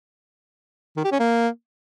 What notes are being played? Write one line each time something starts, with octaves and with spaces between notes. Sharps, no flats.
D#3
G4
C#4
A#3